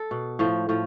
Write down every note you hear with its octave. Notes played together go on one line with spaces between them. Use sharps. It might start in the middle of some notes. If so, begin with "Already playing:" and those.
Already playing: A4
B2
A2 F3
A2 F3